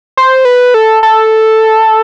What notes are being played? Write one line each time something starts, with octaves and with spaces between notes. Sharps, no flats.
C5
B4
A4
A4